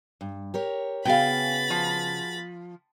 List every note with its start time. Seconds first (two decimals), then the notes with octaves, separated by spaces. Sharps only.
0.21 G2
0.54 G4 A#4 C#5
1.05 C#3 B3 F#4 G#4 F5 G5 B5 A6
1.70 F3